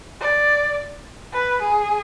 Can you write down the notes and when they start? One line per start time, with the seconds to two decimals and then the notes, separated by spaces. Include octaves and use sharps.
0.21 D5
1.33 B4
1.62 G#4